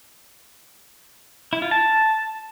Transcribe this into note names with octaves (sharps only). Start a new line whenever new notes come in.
E4
F4
A5